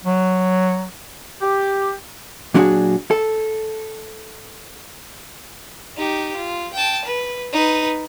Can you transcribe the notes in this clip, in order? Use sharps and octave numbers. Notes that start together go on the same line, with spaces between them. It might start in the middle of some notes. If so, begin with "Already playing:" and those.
F#3
G4
A#2 F#3 D4 E4 F#4 G#4
A4
D#4 G4
F4
G5 A5
B4
D#4 B4